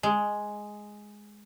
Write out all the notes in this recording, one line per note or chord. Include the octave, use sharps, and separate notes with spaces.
G#3